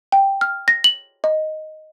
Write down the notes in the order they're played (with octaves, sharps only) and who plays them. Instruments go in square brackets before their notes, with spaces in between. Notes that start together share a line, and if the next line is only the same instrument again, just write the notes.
[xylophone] G5
F6
A#6
F#7
D#5